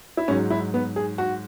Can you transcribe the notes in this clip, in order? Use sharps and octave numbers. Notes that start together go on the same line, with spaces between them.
E4
G#2 F#3 C#4
E4
B3
G#4
F#4